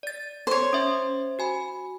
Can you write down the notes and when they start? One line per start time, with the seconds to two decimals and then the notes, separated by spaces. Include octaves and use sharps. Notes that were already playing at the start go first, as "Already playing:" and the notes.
0.03 D5 A6
0.47 C5 C#5
0.73 C#4 E5
1.39 F#4 G#5 B5